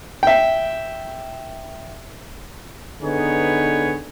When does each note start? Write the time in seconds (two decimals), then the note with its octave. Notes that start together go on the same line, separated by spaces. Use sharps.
0.23 E5 G5
3.02 D3 B3 D#4 G#4 B4 C#5